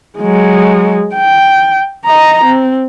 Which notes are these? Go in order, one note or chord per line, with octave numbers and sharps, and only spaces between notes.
F#3 G#3
G5
D#5 A#5
C4